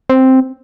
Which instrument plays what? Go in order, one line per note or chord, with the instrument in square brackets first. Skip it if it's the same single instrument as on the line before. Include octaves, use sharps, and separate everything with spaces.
[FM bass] C4